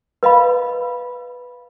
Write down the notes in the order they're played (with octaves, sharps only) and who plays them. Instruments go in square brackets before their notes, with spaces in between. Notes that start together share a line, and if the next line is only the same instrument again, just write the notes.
[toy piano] B4 D#5 F5 B5